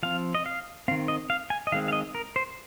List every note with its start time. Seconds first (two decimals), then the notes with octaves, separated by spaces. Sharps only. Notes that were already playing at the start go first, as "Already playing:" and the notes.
0.03 F3 C4 F5
0.35 D#5
0.46 F5
0.88 C4 F5
0.91 D#3
1.08 D#5
1.30 F5
1.50 G#5
1.67 D#5
1.72 D#3 G#3 C4 F5
1.88 F5
1.93 D#5
2.15 A#4
2.36 C5